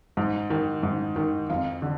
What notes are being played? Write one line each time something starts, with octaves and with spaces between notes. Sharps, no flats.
G#2
D#3
G#2
D#3
F2 F5
D3